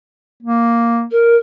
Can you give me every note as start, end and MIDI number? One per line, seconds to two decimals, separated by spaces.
0.43 1.06 58
1.11 1.36 70